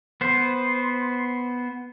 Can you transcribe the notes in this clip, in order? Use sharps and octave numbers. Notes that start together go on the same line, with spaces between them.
B3 C5